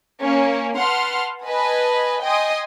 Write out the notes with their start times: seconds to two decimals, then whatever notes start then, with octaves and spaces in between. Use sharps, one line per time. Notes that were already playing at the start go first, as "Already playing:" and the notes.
0.22 A#3 C#4
0.79 B4 F#5 A5 C6 F6
1.46 B4 D#5 G#5 A5
2.24 D#5 G5 G#5 C6 D#6